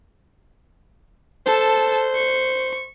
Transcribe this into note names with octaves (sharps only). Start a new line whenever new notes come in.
A4 C5 A5
C#6